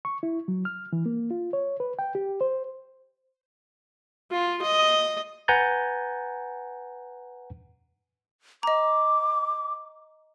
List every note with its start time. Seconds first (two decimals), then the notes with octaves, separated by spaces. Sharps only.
0.05 C#6
0.23 E4
0.48 F#3
0.65 F6
0.93 E3
1.06 A#3
1.31 F4
1.53 C#5
1.80 B4
1.99 G5
2.15 G4
2.41 C5
4.32 F4
4.62 D#5
5.48 B4 F#5 G#5 A#5 G6 A6
8.63 D#5 A#5 D6